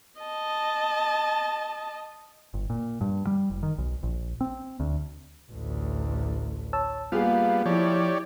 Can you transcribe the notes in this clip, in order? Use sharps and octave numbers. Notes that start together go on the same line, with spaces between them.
D#5 A5
G1
A#2
G2
G3
F#1
D#3
B1
A#1
C4
D2
A1 D2
C#5 A5 E6
G3 A#3 B3 F4 G#4 F5
F3 E4 G4 C#5 D5